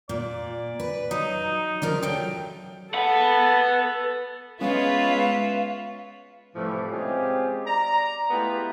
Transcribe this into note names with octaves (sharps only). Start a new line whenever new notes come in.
A#2 D5
B4
F#3 D#4
C#3 F3 A#4 D5
F#3 A3 G5
A4 B4 F#5
G#3 B3 C#4 F4 B4 C#5 E5 F5
A2 C3 E3 F3 G3 A3
G#3 C4 C#4 F4 G4 G#4
D5 A#5
G#3 A3 B3 E4 F4 G4